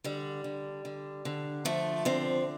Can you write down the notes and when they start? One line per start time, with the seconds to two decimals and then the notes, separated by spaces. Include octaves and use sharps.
0.04 D3 G3
0.44 D3
0.85 D3
1.25 D3
1.65 F3 A3
2.05 D3 C4